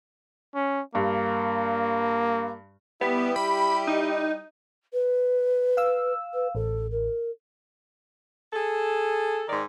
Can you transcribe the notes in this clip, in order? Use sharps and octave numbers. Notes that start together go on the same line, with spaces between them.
C#4
G2 A#3
G3 B3 E4 G4
B5
D#4
B4
F5 E6
B4
A1 A4
A#4
G#4 A4
G#2 D#3 D5